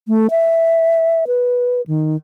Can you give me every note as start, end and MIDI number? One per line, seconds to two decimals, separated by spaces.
0.08 0.27 57
0.31 1.24 76
1.27 1.81 71
1.87 2.16 51